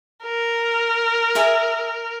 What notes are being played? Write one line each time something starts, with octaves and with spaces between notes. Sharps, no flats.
A#4
G#4 E5